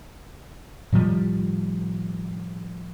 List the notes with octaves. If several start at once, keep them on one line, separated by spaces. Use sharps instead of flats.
A2 D#3 F3 G3